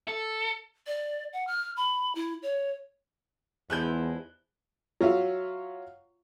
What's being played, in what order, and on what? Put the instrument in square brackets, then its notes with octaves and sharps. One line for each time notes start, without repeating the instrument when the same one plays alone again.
[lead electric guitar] A4
[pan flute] D5
F#5
F6
B5
E4
C#5
[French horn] E2 [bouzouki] F3 G#3 E4 [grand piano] F#6 G6
[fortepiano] F#3 F4 E5 F5